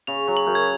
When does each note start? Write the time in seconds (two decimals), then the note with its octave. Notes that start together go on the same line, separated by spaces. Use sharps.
0.07 C#3 F7
0.27 F#3
0.37 F#7
0.47 F#2
0.55 G#6